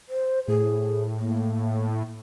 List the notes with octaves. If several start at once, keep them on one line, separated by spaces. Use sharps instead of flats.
C5
A2 G#4
A#3